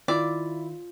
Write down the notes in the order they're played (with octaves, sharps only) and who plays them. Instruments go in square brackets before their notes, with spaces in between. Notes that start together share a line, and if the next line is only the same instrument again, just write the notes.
[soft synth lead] D#3 [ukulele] E4 [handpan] F4 [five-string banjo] D5